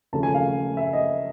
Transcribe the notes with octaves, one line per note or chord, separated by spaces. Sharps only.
D#2 C#3 F3 A3 C#4 A5
G#5
F5
E5
D#5